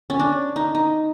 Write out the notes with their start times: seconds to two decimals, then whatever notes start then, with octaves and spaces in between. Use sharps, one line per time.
0.10 C#4
0.19 D4
0.56 D#4
0.75 D#4